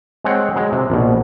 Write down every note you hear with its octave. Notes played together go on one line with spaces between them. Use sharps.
G#3 C4 G#4 C#5 F#5 G5
F#3 G#3
C3
A#1 B2